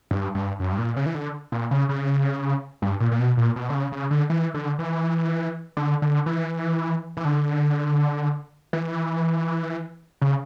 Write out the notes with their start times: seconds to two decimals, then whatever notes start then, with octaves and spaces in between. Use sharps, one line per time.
0.11 G2
0.35 G2
0.60 F#2
0.72 G2
0.78 A#2
0.96 C#3
1.06 E3
1.15 D3
1.52 A#2
1.71 C#3
1.89 C#3
2.82 G2
3.00 A#2
3.11 A#2
3.19 B2
3.37 A#2
3.56 B2
3.70 D3
3.74 C#3
3.92 C#3
4.11 D3
4.30 E3
4.54 D3
4.79 E3
5.77 D3
6.02 D3
6.26 E3
7.17 E3
7.25 D3
8.73 E3
10.21 C#3